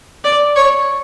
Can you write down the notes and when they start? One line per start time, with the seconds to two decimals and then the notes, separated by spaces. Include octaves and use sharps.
0.24 D5
0.56 C#5